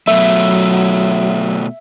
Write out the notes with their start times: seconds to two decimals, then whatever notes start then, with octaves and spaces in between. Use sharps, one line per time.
0.07 B2 F#3 A3 E5